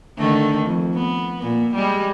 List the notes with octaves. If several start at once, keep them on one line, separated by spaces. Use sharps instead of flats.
D3 D#3 A3
F2
B3
A#2
G3 G#3